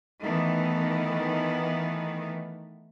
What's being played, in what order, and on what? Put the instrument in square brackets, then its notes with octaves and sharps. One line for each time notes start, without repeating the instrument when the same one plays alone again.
[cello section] D#3 E3 A3 B3